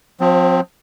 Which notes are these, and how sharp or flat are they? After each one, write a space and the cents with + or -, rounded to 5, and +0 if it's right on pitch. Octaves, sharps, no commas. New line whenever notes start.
F3 +35 C4 +0